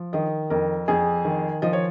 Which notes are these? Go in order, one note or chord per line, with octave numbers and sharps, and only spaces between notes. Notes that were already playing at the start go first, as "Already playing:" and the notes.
Already playing: F3
D#3 D#5
F2 A#4
F2 G#4
D#3
F3 D#5
C#5